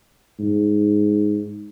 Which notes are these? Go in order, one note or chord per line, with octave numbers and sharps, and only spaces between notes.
G#2